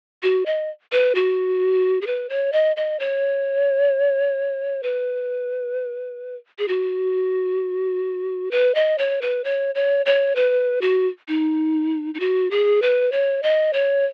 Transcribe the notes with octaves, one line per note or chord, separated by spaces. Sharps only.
F#4
D#5
B4
F#4
G#4
B4
C#5
D#5
D#5
C#5
B4
G#4
F#4
B4
D#5
C#5
B4
C#5
C#5
C#5
B4
F#4
D#4
D#4
F#4
G#4
B4
C#5
D#5
C#5